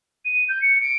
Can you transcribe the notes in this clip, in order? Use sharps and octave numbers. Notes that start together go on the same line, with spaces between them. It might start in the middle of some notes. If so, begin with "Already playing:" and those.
D#7
G6
C#7
D7